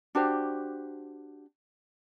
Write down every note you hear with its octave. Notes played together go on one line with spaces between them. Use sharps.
D4 F#4 G4 C5